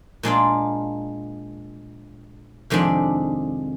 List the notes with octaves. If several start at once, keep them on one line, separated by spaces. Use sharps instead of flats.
A#2 G#3 D4 F4
F2 C3 D#3 G#3 D4